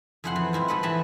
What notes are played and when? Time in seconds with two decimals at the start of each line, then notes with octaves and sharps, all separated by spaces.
0.24 F2 E4 G#4 C5 F#5 C6
0.36 E3
0.53 G#3 C4 E4 F4
0.68 G#4 A4 B4 C5 F#5
0.83 E3 G#4 E5 A5 B5